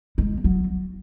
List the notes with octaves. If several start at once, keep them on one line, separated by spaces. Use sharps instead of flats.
G#3
F#3